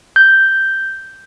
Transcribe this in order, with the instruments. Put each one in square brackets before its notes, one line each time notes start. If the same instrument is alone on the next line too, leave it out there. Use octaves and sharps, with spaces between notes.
[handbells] G6